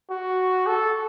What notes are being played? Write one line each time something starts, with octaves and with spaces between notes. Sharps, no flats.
F#4
A4